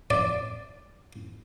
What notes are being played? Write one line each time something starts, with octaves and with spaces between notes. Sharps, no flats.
D5